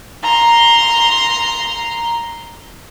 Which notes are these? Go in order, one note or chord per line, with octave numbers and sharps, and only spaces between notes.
A#5 C6